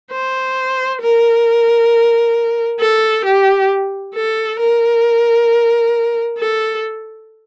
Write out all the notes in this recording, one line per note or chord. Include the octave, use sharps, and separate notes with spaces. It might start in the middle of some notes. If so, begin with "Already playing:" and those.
C5
A#4
A4
G4
A4
A#4
A4